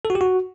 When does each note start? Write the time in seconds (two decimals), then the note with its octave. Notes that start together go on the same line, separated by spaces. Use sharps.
0.05 A4
0.10 F#4
0.15 G4
0.21 F#4